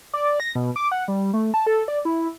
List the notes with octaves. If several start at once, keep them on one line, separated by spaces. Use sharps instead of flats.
D5
A#6
B2
D6
F#5
G3
A3
A5
A4
D5
E4